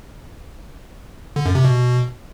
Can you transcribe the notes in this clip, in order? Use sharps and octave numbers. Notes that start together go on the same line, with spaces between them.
D3
F#2
C3
B2